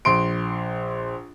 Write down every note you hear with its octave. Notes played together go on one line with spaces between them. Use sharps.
A#1 C6 D7